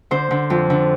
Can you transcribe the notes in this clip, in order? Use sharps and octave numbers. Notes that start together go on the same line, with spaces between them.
D3 C5
D3
F2
D3